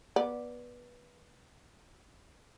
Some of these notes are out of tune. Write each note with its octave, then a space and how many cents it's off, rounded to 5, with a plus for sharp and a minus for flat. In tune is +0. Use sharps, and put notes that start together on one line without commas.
B3 -20 D5 +0